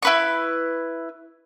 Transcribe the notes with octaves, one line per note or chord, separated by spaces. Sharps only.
E4 B4 C#6